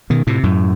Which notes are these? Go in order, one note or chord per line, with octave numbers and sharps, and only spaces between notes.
B2 D#3
A2 C3
F#2 A2